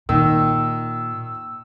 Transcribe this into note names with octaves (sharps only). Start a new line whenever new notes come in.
A#2 D#3 E6